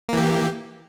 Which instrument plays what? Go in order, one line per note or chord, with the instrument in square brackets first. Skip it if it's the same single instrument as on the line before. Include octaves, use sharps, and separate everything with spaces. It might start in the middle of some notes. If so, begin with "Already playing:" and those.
[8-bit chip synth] A#3
E3
G4